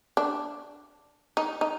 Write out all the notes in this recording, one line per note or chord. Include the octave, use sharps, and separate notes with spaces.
D4
D#4
D#4